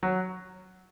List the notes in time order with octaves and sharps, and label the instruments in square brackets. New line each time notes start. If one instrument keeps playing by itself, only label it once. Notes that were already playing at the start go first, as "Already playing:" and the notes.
[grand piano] F#3